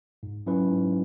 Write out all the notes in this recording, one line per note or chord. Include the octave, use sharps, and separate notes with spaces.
G#2
F#3 C#4 E4 B4
G#2